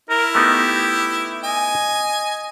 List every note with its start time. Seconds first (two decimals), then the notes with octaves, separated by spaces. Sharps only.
0.10 E4 A#4
0.35 A3 B3 D#4 G4
1.44 D#5 G#5